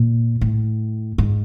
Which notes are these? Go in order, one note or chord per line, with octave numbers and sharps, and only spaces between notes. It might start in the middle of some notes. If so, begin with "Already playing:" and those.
Already playing: A#2
A2
G#2